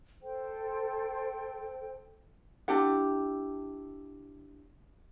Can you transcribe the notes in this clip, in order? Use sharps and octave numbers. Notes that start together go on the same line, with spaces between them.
A4 C5 G5
D4 E4 G4 F#5